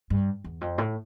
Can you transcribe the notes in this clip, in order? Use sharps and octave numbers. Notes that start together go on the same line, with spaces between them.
G2
E2
F2
A2